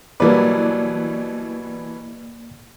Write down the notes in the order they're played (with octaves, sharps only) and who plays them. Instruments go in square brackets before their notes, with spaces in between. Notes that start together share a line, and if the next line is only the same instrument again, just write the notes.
[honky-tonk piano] B2 E3 D4 [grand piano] F#3 G3 B4 [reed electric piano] A#3 D5